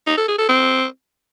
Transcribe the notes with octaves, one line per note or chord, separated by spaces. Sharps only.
D#4
A4
G#4
A4
C4